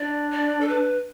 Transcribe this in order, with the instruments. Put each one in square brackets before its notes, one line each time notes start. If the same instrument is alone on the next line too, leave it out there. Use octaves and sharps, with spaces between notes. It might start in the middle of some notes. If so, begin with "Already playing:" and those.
Already playing: [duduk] D4 [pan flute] D5
[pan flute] D5
A4
B4